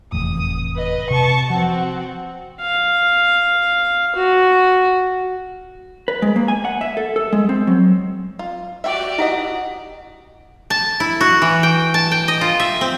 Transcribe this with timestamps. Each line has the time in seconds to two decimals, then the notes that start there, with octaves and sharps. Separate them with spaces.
0.12 F1 E2 A2 D#6
0.75 B4 D#5
1.10 C3 A5 C#6
1.50 F3 C4 F#4
2.61 F5
4.15 F#4
6.08 B4
6.22 G#3
6.36 A#3
6.48 G#5
6.65 F#5
6.81 E5
6.97 A4
7.16 A4
7.33 G#3
7.49 C4
7.67 F#3
8.39 F4
8.84 F#4 G4 D5 E5 G5
9.18 D#4 E4 D#5 F#5
10.70 A5
11.00 E4
11.21 F#4
11.42 E3
11.63 G5
11.94 A5
12.11 G5
12.28 D#5
12.41 F4
12.60 E5
12.81 C4